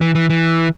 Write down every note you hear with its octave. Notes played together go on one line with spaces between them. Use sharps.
E3
E3
E3